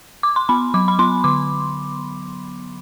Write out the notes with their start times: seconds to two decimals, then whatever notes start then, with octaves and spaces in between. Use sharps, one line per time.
0.23 D6
0.36 C6
0.49 B3 B5
0.74 F#3 D6
0.88 B5
0.99 B3 C6
1.24 D3 D6